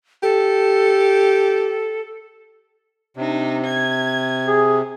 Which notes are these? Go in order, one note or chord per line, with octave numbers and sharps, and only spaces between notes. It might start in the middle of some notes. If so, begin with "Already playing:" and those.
G4 A4
C3 D4 D#4
G#6
G#4